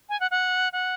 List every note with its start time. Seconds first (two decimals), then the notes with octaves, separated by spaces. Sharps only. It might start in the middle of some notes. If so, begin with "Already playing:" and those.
0.09 G#5
0.20 F#5
0.31 F#5
0.73 F#5